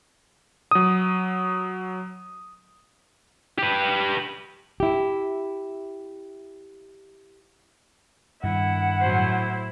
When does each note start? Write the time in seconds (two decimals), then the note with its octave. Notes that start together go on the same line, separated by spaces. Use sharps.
0.71 F#3 D#6
3.58 G4 B4
4.80 E4 G4
8.43 G2 D#3 E4 F#5
9.01 A2 F#3 C5